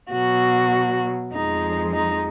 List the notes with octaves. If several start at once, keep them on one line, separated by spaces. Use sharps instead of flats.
B2 F#3 F#4
F2 F3 G#3 D#4
D#4